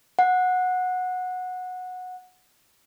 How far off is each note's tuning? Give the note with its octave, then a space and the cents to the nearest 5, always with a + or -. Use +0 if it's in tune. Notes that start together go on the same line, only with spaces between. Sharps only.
F#5 -15